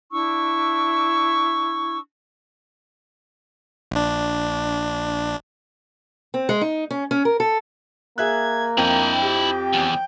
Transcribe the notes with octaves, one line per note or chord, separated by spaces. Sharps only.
D4 E4 C#6 E6
A#1 D4
C4
G#3
D#4
C#4
C#4
A#4
A4
A#3 G#4 E5 F#6 G#6
F2 E4 D#5 G5
G4
E2